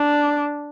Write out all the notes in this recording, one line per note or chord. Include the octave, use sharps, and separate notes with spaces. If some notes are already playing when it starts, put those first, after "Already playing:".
Already playing: D4